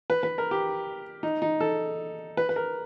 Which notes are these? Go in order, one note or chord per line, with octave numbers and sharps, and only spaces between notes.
B4
B4
A#4
G4
D#4
D#4
A4
B4
B4
A#4